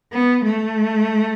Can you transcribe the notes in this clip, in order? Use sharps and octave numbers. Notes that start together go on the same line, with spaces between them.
B3
A3